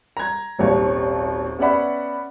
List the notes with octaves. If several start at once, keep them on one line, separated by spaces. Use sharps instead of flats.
A#5 G#6
D#1 G#1 D#2 C#5
B3 C#4 D5 E5 F#5 B5